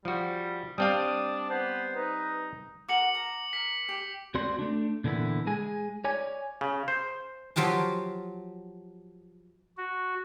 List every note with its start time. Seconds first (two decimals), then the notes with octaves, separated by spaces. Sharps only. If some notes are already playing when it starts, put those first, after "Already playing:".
0.05 F3 G3 F#4
0.78 G3 C4 D4 F5 D#6
1.50 B3 C5
1.96 D#4 B4
2.88 F#4 A#4 D6 C#7 F#7
3.15 A#5
3.53 A#4 B6
3.89 G4
4.34 C#2 C4 F#4 D5 C6
4.59 A3 D4
5.04 A#2 D3 E3 B3 E4
5.47 G#3 G#4 G#5
6.04 C#5 D5 G#5
6.61 C#3
6.88 C5
7.56 F3 F#3 F4 G4 A5
9.77 F#4